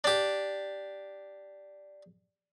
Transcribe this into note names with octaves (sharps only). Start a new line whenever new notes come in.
D4 G4